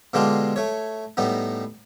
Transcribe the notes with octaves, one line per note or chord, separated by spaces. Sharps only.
B2 D3 G#3 D4 F4 G4
A3 C#5
A2 G3 B3 D#4